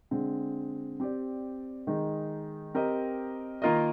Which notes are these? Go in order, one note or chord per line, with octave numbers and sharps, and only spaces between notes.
D3 G#3 C4
C4 G4 D5
D#3 G#3 D#4
C4 G4 A#4 D#5
D#3 A#3 F4 A#4 D#5